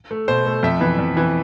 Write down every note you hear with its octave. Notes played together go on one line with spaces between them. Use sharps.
A3
B2 C5
A3
F2 E5
E3 B3
F2
E3 B3